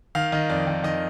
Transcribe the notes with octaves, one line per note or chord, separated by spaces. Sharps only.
D#3 F5
D#3 D#5
F2 D5
D#3
D#3 D#5